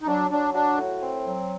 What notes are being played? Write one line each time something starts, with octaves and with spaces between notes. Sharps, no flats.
D#4
F#3 D4
F#3 D4
D4 F#4
A2
C4
F#3